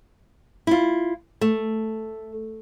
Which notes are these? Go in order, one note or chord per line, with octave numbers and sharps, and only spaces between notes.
E4 F4
A3